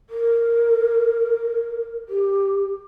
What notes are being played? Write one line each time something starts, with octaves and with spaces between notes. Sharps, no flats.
A#4
G4